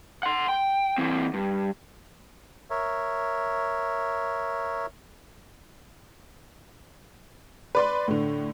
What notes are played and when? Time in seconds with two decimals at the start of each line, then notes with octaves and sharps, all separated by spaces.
0.23 F#5 C6
0.49 G5
0.98 E3 C4
1.34 G2
2.70 A#4 C#5 E5
7.75 B4 D5 C6
8.08 A2 D3